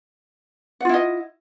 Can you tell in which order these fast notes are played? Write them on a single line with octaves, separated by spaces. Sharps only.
F#5 F4 E4 D#5